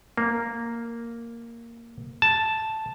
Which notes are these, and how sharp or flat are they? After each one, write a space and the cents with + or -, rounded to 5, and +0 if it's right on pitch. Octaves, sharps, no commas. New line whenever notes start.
A#3 -5
A5 +0